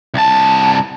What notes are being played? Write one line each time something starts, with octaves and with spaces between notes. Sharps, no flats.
C2 A5